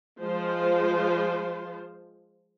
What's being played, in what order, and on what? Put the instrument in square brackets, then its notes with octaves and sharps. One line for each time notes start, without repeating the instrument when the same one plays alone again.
[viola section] F3 G#3 F4 C5